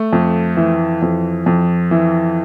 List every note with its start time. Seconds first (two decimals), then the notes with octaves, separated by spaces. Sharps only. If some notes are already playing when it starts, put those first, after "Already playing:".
Already playing: A3
0.13 F2
0.57 E3
1.02 F2
1.46 F2
1.91 E3